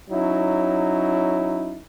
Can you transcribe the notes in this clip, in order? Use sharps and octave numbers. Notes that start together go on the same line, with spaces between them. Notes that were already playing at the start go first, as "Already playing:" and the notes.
F#3 C#4 D#4 E4